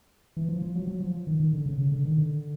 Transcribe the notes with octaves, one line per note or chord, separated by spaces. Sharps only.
E3
F3
F3
F#3
F#3
F3
D#3
D#3
D3
C#3
C#3
D3
D#3
D3